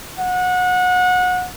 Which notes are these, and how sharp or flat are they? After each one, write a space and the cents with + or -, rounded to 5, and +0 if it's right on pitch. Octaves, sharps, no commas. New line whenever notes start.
F#5 -25